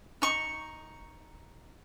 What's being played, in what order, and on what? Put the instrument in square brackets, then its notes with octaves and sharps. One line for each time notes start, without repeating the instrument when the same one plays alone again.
[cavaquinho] D#4 C#6